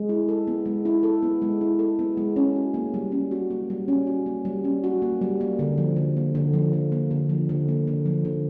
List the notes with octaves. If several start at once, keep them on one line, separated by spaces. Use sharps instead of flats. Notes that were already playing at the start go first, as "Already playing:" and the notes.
Already playing: G#3
E4
A4
B3
G#3
E4
A4
B3
G#3
E4
A4
B3
G#3
C#4
F#4
A#3
G3
C#4
F#4
A#3
G3
C#4
F#4
A#3
G3
C#4
F#4
A#3
G3
A#3
D3
F3
D3
A#3
D3
F3
D3
A#3
D3
F3
D3
A#3
D3
F3
D3